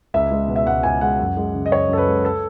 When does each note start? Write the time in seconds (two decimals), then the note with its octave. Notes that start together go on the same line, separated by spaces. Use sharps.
0.14 C#2 E5
0.31 G#3
0.48 B2
0.56 E5
0.66 C#2 F#5
0.83 C#2 G#5
1.01 G#3 F#5
1.19 F#2
1.37 G#3
1.55 C#3
1.66 D#5
1.71 F#2 C#5
1.89 F#2 A4
1.98 B4
2.07 G#3
2.25 A4